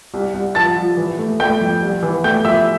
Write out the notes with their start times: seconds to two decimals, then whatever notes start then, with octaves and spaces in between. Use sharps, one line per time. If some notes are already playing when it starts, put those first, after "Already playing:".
0.14 C2
0.34 C2
0.55 F3 A5 A6
0.77 F3
0.97 E3
1.19 A3
1.40 A3 G5 G6
1.61 F2
1.82 C2
2.03 E3
2.24 A3 G5 G6
2.45 F3 E5 E6